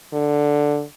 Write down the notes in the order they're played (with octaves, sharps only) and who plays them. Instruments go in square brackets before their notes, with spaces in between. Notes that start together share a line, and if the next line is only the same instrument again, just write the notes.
[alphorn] D3